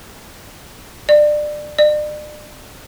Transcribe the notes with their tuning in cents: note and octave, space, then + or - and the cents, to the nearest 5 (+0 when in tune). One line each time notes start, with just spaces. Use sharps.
D5 +25
D5 +40